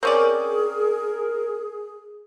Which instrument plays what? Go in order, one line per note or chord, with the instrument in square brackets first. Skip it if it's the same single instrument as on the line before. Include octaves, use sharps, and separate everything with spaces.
[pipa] C4 C#4 D5 [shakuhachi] G#4 [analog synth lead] A#4